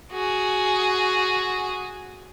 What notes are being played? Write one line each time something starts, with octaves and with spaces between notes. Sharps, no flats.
F#4 G#4